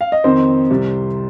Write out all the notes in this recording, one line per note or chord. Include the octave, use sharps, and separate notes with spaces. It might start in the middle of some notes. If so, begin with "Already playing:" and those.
F5
D#5
F2 D#3 C4 D#4 C5
C2 C3 G3